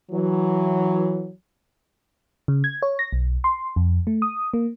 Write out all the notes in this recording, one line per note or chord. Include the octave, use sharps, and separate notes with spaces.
E3 F#3
C#3
G#6
C#5
A#6
B1
C6
F2
A3
D#6
A#3